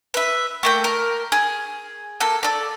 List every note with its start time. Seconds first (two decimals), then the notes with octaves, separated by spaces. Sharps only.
0.14 B4 E5
0.63 A3 A#3 G5
0.84 A#4
1.32 G#4
2.20 A#3 A4
2.43 A4 D5